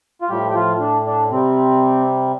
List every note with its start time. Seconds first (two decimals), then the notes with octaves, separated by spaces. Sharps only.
0.22 F4
0.29 A2 F3 G3 G4
0.50 G4
0.55 F3 F4
0.80 D4
1.06 D4
1.31 C3 G3 C4